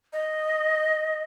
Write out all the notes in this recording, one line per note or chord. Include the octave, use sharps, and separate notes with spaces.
D#5